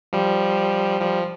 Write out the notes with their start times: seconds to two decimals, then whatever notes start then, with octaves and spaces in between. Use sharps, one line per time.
0.13 F3 G3
1.01 F3 G3